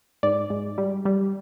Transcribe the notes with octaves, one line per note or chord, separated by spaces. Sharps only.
G#2 D5
G#2
G3
G3